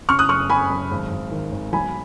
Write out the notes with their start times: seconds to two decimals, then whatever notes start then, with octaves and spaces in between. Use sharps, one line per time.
0.09 C#3 C#6 F6
0.19 D#6 F#6
0.29 F#1 C#6 F6
0.50 F#1 G#5 B5
0.70 F#2
0.91 G#1
1.11 G#1
1.31 D#3
1.52 G#1
1.73 B1 G#5 B5